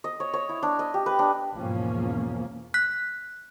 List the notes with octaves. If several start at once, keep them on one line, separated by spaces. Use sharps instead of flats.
D#5
C#5
C#5
E4
D4
D#5
G4
B4
D4
E2 G#2 B2 F3 A#3 C#4
F#6 B6